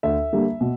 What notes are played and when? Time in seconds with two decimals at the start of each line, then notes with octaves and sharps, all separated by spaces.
0.03 D2 E5
0.33 D3 G3 A#3
0.61 B2